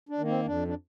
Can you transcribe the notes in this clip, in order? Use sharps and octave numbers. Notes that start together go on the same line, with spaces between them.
D4
D#3 A#3
C4
F2 D4
D4